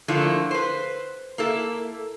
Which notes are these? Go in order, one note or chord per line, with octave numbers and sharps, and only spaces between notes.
D3 F3 A3 A#3 E4
B4 C5
A#3 E4 A4